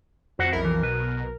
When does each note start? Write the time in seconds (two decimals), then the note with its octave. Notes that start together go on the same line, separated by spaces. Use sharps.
0.39 F2 F#4 C5 F#5
0.53 B1 E4 A#4
0.65 E3
0.83 B2 B4